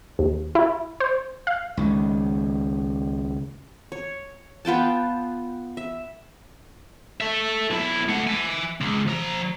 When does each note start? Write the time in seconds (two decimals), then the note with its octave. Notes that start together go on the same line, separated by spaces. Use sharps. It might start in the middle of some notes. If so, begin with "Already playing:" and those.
0.19 D#2
0.55 E4
1.00 C5
1.47 F5
1.77 C#2 D#3
3.92 C#5
4.65 B3 F4 G5 A5
5.77 E5
7.20 A4 E5
7.70 B1 E4
8.09 A3 F#5
8.27 E5 G#5
8.81 C#2
9.08 F3 A#5